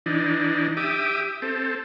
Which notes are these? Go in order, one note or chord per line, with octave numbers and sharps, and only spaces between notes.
E3 D4 D#4
G4 E5 D6 D#6
C4 A4